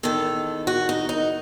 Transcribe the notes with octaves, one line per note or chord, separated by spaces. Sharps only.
E2 D#3 A4
F#4
D#4
D#4